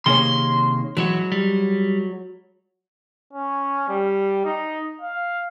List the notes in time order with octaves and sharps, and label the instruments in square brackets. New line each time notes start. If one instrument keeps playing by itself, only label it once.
[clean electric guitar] C3 D#3 A#3 [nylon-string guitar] C#4 G#4 [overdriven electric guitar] C6
[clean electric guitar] E3 E4 C#5 [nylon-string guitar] F#3 G#3 F#4
[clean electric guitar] G3
[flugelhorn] C#4
G3
D#4
F5